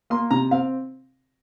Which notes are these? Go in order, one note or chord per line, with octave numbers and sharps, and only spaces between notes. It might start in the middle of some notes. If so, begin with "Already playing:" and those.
A#3 C6
C3 A#5
C4 F5